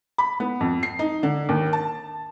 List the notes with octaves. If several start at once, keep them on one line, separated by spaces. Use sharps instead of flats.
B5
B3
F2
C7
D#4
D3
D#2
A5